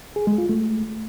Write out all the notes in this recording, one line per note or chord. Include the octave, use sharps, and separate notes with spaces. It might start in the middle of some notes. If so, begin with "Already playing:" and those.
G#4
G#3
F4
A3